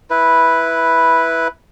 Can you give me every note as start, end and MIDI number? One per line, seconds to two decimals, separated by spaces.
0.10 1.48 64
0.10 1.48 71